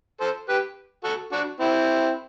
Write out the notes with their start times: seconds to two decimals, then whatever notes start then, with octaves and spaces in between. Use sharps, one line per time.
0.21 A4 C5
0.49 G4 B4
1.04 F#4 A4
1.32 D4 F#4
1.60 C4 E4